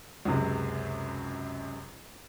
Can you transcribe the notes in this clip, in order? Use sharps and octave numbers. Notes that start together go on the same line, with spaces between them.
C#2 F#2 C3